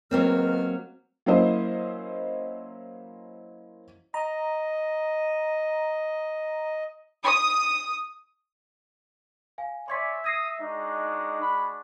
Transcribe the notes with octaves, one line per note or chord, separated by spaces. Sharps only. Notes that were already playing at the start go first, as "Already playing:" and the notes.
C#2 D#3 F#3 A#3 C4 F6
F#3 A#3 C#4 E4 C5 D#5
D#5 A#5
D#6
F5 G#5
C#5 D5 E5 G#5 C6 G#6 B6
D#6 G#6 A#6 C7
G#3 D4 D#4 F#4
B5